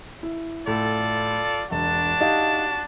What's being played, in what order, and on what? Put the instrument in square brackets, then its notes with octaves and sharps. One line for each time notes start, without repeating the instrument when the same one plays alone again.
[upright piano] E4
[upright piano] A2 [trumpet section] F4 A4 D5
[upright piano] E1 [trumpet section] D4 F#4 A5
[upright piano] D#4 G4 F5